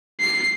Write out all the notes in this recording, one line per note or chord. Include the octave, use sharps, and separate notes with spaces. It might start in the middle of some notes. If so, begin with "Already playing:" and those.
C7